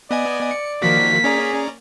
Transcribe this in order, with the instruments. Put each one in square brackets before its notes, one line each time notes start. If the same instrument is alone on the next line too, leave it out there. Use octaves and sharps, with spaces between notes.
[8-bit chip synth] B3 D#5 G#5 [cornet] D5
[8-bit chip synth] C#7
[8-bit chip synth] D#3 F3 F#4 [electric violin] A#3 B6
[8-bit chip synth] C#4 D5 A#5 [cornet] G#4